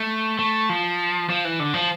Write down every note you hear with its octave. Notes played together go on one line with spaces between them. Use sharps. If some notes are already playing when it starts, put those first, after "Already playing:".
Already playing: A3
A3
F3
F3
E3
D3
F3